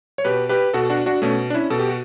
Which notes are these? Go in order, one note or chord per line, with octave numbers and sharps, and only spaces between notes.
C#5
B2 G4 B4
G4 B4
B2 F#4 A4
D4 F#4
D4 F#4
B2 A3 C#4
D4
C#4 E4
B2 A4
G4
F#4